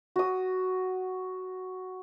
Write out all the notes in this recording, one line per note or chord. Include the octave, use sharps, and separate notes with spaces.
F#4 D#6